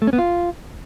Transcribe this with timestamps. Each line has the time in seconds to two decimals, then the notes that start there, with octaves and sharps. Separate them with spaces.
0.02 A3
0.07 C#4
0.13 B3
0.19 F4